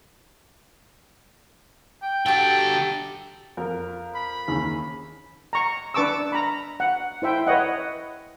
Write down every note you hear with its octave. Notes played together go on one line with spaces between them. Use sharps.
G5
D3 F#4 G4 A4 G5
F2 A#4
B5
D#2 C#3 G#4
A#5 C#6
D4 B4 A5 C#6 D6 E6
A#5 B5
F#5
E4 C5 E5 G5
B4 C#5 D#5 F#5